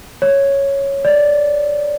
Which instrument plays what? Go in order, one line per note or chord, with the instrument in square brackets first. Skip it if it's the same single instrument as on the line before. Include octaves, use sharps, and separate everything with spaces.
[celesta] C#5
D5